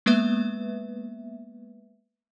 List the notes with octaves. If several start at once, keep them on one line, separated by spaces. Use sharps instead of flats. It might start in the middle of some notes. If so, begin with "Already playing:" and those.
G#3 A#3 B3 B4 E5